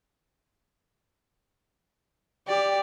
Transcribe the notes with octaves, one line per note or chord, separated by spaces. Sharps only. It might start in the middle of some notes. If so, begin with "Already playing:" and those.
G4 D5